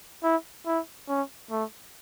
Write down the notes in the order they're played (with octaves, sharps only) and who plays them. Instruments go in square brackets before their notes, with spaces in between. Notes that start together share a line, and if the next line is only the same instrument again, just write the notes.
[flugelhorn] E4
E4
C#4
A3